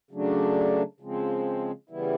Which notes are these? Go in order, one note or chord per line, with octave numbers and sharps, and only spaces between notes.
C#3 F#3 A3 D4
C#3 F3 G#3 C4
C#3 E3 G3 B3 E4